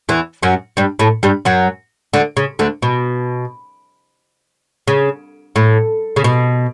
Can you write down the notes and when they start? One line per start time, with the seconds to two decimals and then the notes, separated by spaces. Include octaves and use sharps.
0.09 E2 E3
0.43 F#2 F#3
0.77 G2 G3
0.99 A2 A3
1.23 G2 G3
1.45 F#2 F#3
2.13 D2 D3
2.37 C#3
2.59 D2 D3
2.82 B2
4.88 C#3
5.56 A2
6.16 C#3
6.24 B2